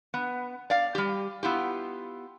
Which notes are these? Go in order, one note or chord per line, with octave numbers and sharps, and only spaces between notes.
B3
D5 F5
G3 G4
B3 E4 F4 G4